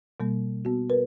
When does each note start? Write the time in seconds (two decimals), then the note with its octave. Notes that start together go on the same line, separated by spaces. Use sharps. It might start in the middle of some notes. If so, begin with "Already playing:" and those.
0.20 B2 G3 A#3
0.65 B3 F#4
0.90 A#4 B4